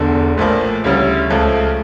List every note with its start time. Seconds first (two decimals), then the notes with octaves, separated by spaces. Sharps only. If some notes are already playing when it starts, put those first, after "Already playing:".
Already playing: E1 E2 D3
0.37 A#1 A2 F3 A#3
0.84 D2 C#3 G3 C#4 E4
1.30 C#2 C#3 F3 A3